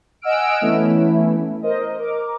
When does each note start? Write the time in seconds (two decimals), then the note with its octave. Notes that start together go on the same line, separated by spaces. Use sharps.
0.22 D#5 F#5 G#5 E6 F6 D7
0.61 E3 A3 B3 C#4 E4
1.62 A#4 C5 D#5
1.97 A#4 D6